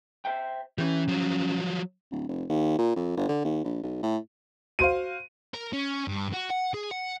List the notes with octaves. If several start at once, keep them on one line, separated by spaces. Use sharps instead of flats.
C5 E5 G5
E3 C#4 G4
F3 F#3
D1
F1
D#2
A#2
F2
G1
D3
D#2
A#1
B1
A2
F#4 C5 F5 D#7
A#4
C#4
G2
F#4
F#5
G#4
F#5